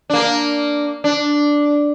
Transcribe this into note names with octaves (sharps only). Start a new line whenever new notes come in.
A#3 D4
D4